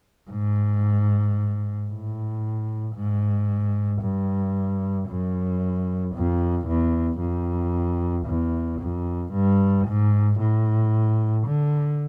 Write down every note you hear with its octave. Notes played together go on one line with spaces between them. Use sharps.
G#2
A2
G#2
G2
F#2
F2
E2
F2
E2
F2
G2
G#2
A2
D3